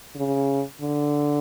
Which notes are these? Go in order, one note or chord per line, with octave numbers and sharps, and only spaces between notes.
C#3
D3